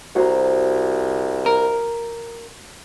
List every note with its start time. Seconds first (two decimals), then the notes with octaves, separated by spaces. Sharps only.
0.15 C2 F#4 C5 A#5
1.46 A#4